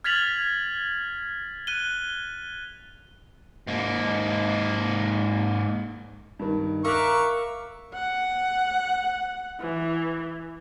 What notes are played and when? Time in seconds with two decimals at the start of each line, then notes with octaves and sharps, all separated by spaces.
0.04 F6 G#6 A6 B6 F7 F#7
1.67 F#6 D#7 G7
3.67 G#2 A#3
6.39 G2 D#3
6.85 A#4 E5 F5 C#6 D6 F6 F#6
7.94 F#5
9.61 E3